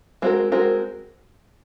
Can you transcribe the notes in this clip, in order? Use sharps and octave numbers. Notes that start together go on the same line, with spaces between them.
G#3 C4 F#4 A#4
G#3 C4 F#4 A#4